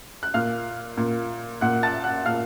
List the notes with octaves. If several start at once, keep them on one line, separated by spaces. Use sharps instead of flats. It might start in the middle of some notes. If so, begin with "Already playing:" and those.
F#6
A#2 F5 F6
A#2
A#2 F#5 F#6
A5 A6
F#5 F#6
A#2 F5 F6